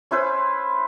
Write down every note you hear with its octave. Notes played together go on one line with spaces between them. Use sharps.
C#4 E4 B4 C5